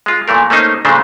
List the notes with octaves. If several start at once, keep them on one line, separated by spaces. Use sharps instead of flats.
G#3 F4
A#2 E3 A3 A#4
A3 A#3 C#4 D#4 C5
A#2 C#3 G#3 A3 D4 C5